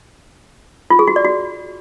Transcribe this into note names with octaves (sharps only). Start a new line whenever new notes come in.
F4
G#4
F#4
D5
F#4